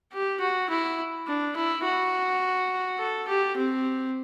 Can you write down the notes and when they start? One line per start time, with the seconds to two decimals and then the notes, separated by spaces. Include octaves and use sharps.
0.13 G4
0.41 F#4
0.70 E4
1.27 D4
1.56 E4
1.84 F#4
2.99 A4
3.28 G4
3.56 C4